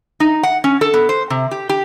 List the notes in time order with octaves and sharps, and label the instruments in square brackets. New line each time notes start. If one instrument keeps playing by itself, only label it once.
[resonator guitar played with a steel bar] D#4
F#5
C#4
A4
B3
C5
C3
G4
G4